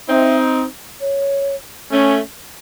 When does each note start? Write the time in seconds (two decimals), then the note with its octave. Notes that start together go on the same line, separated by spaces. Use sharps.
0.08 C4 D#4 E5
1.00 C#5
1.91 A3 C#4